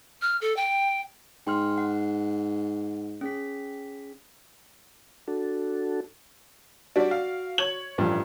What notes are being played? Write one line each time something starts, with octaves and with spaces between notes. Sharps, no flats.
F6
A4
G5
G#2 G5 C6 F6
F#5
C#4 G#4 B6
D4 F#4 A4
G3 D4 F#4 D5
F5
C#5 G#6 F#7
A1 G2 F3